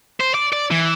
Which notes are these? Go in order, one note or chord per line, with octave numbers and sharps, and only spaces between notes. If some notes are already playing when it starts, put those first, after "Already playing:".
C5
D5
D5
E3